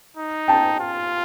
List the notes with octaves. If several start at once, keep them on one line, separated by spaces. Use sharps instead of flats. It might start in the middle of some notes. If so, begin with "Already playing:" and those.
D#4
G5 A5
F4